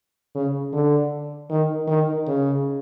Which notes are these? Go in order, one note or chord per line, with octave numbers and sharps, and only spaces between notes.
C#3
D3
D#3
D#3
C#3